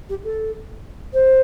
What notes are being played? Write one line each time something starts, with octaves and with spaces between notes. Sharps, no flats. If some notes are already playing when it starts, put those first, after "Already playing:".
G4
A4
C5